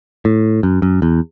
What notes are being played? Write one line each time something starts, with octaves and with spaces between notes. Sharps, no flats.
A2
F#2
F#2
E2